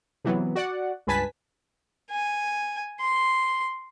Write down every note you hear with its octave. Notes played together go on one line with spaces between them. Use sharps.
C3 E3 F#3 B3
F#4 D5 F#5
C#2 G2 B4 G#5 A5 B6
G#5
C6